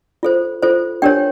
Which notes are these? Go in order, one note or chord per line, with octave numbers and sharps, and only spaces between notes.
F4 A4 C5
F4 A4 C5
D4 G4 A#4 C#5 G5